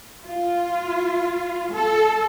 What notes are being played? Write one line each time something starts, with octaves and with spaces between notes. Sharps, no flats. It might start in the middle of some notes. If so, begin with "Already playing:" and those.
F4
A4